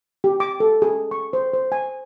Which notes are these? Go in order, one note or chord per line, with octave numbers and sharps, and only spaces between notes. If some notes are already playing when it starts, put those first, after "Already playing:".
G4
D6
A4
G#4
C#6
C5
C5
G#5